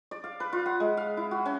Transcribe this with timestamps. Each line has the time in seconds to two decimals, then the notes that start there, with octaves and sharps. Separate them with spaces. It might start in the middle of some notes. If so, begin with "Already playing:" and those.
0.11 D5
0.24 F5
0.40 B4
0.53 F4
0.66 F#5
0.80 G#3
0.97 F5
1.17 E4
1.31 F#4
1.46 C#4